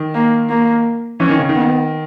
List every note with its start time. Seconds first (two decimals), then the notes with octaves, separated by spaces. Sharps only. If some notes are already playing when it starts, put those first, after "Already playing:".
Already playing: D#3
0.15 A#3
0.49 A#3
1.20 E3 C#4
1.29 D#3
1.39 C#3
1.49 D#3
1.55 B3